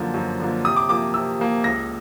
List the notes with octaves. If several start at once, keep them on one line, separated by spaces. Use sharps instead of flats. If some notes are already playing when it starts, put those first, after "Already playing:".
Already playing: F#2 D3 F3 A#3
F#2
D3 F3 A#3
C3 D#6
D6
F3 A#3 D6
C3 E6
F3 A#3
C#2 A#6